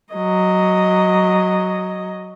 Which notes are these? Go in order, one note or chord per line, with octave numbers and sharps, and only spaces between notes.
F#3 D#5